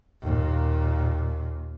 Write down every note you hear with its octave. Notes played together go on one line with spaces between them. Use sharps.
D#2 A#2